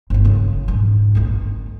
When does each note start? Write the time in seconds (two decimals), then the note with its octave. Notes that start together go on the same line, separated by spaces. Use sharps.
0.10 G1 A#3
0.25 C#3
0.68 F2 G#2
1.15 G1 G#3